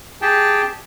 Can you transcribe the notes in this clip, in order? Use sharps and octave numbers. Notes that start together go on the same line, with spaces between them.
G4 G#4 G5 A5